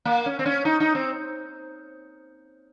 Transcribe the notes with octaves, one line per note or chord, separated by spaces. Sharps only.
A#3
C#4
C4
C#4
D#4
D#4
C4